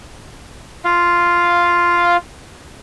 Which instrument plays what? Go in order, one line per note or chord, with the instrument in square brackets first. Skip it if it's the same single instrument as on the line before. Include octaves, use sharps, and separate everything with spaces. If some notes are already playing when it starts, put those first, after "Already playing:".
[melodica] F4 F5